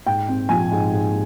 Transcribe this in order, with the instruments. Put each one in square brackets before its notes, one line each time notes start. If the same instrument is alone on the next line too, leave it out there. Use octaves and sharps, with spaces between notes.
[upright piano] G#2 G5
C4
F3 G#5
G#2
G#2